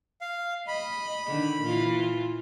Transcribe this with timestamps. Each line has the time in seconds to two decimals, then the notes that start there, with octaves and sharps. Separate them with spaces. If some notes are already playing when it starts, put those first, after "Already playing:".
0.21 F5
0.68 D#5 B5
1.28 D3 D#3
1.62 A#2 E3 F4